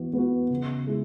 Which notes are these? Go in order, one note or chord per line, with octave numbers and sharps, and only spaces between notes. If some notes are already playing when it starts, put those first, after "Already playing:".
Already playing: E3 B3 F#4
B3 F#4
C#3
G#3 E4